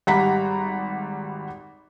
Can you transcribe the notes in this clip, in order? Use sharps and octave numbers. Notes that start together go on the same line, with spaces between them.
G#1 G3 F#5 A#5 B5 B6